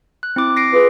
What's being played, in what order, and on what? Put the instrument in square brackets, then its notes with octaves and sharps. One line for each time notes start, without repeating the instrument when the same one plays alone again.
[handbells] F#6
C4 E4 D6
A#6 C7 D7
[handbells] F4 G#4 [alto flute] B4